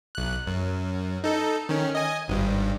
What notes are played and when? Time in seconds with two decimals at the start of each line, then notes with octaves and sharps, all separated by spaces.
0.15 B1 F#6
0.47 F#2
1.24 D#4 A4
1.69 D#3 C#4
1.95 D#5 G#5
2.28 G#1 G2